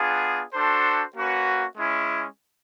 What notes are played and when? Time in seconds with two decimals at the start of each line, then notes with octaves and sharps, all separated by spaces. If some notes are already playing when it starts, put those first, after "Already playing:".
Already playing: B3 D4 F4 G#4
0.54 D4 F#4 A4 C5
1.15 A#3 C#4 F#4 B4
1.77 G#3 C#4 E4